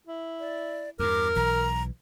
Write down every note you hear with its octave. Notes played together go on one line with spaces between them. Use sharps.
E4
D5
E2 G2 A#4 D6
B1 E3 A#5